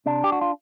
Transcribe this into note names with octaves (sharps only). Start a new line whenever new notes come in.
C3 D4
G4
F#4
F4